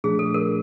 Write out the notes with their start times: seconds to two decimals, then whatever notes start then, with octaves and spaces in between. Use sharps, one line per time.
0.04 A#2 F3 A3 D4 G#4
0.19 A4
0.34 A#4